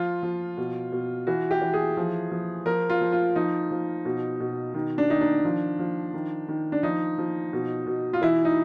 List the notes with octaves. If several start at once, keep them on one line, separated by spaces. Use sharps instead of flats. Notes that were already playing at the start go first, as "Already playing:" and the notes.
Already playing: F3 F4
F3
B2
B2
E3 F#4
G4
E3
G#4
F3
F3
F3 A#4
F4
F3
F4
F3 D#4
F3
B2
B2
D#3
D4
D#3 D#4
D4
F3
F3
D#3
D#3
D4
F3 D#4
F3
B2
B2
F4
E3 E4
D#4